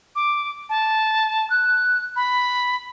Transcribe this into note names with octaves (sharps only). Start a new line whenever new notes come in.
D6
A5
F#6
B5